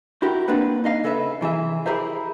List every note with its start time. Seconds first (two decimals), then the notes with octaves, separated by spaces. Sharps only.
0.22 E4 F#4 G4 A#4
0.48 A#3 C4 D4 B4 F#5
0.84 D#4 D#5 F5
1.04 C#3 A4 B4 E5
1.41 C3 E3 G#4 E5
1.86 E4 G4 G#4 A#4 C5 E5